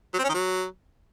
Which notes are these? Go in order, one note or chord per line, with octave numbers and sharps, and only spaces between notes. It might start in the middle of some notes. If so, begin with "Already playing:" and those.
F#3
C4
C#4
D#3
F#3